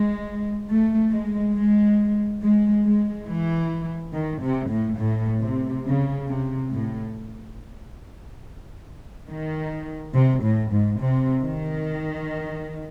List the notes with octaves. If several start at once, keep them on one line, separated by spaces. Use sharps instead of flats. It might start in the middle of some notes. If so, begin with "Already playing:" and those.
Already playing: G#3
A3
G#3
G#3
G#3
G#3
E3
D#3
C3
A2
A2
C3
C#3
C3
A2
D#3
C3
A2
G#2
C3
D#3